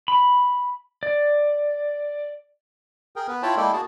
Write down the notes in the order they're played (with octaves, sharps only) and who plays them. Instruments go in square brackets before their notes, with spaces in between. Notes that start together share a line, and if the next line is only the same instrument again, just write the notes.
[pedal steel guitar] B5
D5
[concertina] G#4 A#4 G5
B3 B4
E4 F4 C#5 G5 A5 B5
G#3 A#3 E4 A4 D5 G5
A#3 F#4 G#4 A5